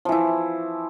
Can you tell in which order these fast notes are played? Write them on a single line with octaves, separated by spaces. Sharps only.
F3 E3 E4